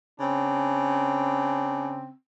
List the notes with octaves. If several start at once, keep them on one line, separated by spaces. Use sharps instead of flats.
C#3 C4 D4